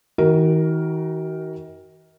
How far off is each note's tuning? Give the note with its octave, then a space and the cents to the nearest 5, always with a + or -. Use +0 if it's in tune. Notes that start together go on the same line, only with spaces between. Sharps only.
D#3 +45 F#4 +30 A#4 +0